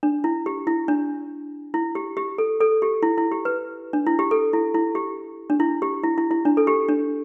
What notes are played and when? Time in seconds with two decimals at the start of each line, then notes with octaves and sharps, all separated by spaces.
0.03 D4
0.24 E4
0.46 G4
0.67 E4
0.88 D4
1.74 E4
1.95 G4
2.17 G4
2.38 A4
2.61 A4
2.82 G4
3.03 E4
3.18 E4
3.32 G4
3.45 B4
3.93 D4
4.06 E4
4.19 G4
4.31 A4
4.53 E4
4.74 E4
4.95 G4
5.50 D4
5.60 E4
5.82 G4
6.03 E4
6.18 E4
6.31 E4
6.45 D4
6.57 A4
6.67 G4
6.89 D4